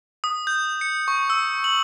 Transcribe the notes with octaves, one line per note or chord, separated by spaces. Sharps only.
D#6
G6
C#7
C#6
E6
F#7